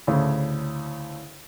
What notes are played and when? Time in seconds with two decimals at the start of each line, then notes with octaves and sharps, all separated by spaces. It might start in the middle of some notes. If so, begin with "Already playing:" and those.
0.07 D2 A2 C#3